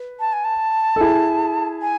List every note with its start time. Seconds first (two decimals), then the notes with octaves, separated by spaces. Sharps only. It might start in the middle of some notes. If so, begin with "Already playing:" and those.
Already playing: B4
0.20 A5
0.33 G#5
0.44 A5
0.96 A4
1.00 E4 G#4
1.82 G#5